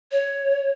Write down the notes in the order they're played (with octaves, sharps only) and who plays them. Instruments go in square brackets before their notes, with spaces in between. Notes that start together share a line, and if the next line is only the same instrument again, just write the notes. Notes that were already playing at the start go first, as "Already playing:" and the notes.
[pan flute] C#5